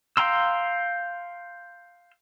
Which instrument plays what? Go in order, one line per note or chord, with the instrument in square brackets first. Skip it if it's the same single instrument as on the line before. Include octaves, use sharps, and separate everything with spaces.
[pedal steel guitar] F5 G5 A#5 C6 E6